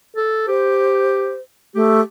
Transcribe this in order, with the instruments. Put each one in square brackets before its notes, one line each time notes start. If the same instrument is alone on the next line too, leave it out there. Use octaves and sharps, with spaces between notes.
[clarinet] A4
[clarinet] G4 [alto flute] C5
[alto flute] A3 [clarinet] G4